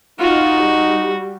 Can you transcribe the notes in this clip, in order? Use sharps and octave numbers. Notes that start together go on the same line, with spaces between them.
D#4 F4 F#4
G3